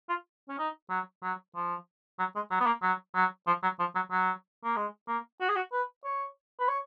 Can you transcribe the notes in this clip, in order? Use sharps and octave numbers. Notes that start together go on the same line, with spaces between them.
F4
C#4
D#4
F#3
F#3
F3
F#3
G#3
F#3
B3
A#3
F#3
F#3
F3
F#3
F3
F#3
F#3
A#3
G#3
A#3
F#4
G#4
F#4
B4
C#5
B4
C#5